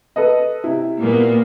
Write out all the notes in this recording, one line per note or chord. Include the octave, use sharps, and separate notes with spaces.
A4 B4 D#5
C3 E4
A#2 A#3 B3